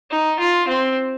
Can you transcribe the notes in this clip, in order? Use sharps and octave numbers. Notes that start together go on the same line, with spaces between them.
D#4
F4
C4